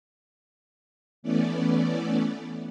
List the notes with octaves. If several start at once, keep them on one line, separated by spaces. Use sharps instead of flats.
E3 A3 B3 C#4 D5